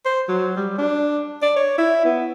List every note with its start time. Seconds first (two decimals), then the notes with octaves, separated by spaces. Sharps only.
0.05 C5
0.29 F#3
0.56 G3
0.78 D4
1.42 D5
1.56 C#5
1.78 E4
2.05 B3